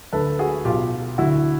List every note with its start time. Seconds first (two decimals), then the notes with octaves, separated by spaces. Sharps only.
0.12 D2 D3 A4 B4
0.39 F#4 G#4
0.65 B1 B2 F4 G4
1.18 D2 D3 E4 F#4